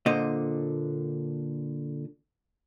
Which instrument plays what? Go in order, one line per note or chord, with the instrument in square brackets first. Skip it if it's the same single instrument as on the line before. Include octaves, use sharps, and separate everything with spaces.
[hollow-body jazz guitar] A#2 D3 C5 D#5